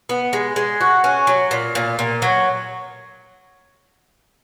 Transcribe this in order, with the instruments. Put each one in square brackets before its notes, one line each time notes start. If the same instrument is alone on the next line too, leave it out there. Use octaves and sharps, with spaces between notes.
[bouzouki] B3
G#3
G#3
F#4
C#4
F#3
A#2
A#2
A#2
F#3